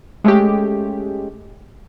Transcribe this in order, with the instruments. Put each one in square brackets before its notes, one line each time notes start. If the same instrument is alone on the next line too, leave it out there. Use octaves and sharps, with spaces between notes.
[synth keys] G#3 A3 C#4 G4